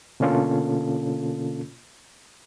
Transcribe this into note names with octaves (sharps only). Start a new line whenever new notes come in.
B2 D3 A#3 C#4 F4 A4